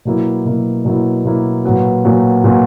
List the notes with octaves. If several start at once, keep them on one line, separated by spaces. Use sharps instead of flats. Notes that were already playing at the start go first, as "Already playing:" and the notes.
B2 F#3 A#3 E4
B2 F#3 A#3 E4
B2 F#3 A#3 E4
B2 F#3 A#3 E4
A#2 F#3 B3 F#4
A#2 F#3 B3 F#4
A#2 F#3 B3 F#4